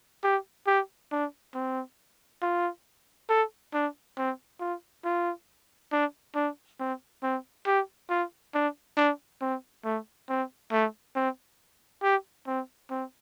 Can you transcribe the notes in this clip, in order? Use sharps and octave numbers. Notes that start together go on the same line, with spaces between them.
G4
G4
D4
C4
F4
A4
D4
C4
F4
F4
D4
D4
C4
C4
G4
F4
D4
D4
C4
A3
C4
A3
C4
G4
C4
C4